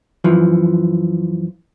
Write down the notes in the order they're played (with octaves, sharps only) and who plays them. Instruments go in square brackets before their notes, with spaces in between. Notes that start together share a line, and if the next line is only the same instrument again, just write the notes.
[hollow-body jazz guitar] F#2 E3 F3